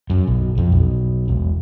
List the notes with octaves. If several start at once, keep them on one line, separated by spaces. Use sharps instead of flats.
F#2
B1
F2
B1
E1